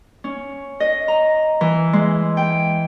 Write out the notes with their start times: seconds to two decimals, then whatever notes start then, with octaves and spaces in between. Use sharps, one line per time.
0.24 C#4
0.80 D#5
1.08 A#5
1.61 E3
1.93 G#3
2.37 G5